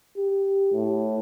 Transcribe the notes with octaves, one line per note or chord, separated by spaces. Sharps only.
G4
A2